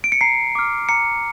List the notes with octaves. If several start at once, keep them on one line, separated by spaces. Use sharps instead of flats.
D7
C#7
A#5 C7
D6 F6
A#5 C#7